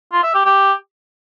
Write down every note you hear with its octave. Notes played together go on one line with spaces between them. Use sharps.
F4
E5
G4
G4